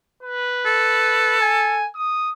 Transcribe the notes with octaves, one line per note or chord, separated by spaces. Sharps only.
B4
A4
G#5
D#6